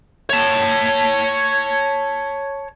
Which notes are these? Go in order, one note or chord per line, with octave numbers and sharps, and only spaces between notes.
C#5 A5